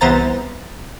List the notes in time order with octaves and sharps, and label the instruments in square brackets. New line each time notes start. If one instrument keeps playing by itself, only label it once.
[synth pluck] C2 E3 B3 C5 A#5 A6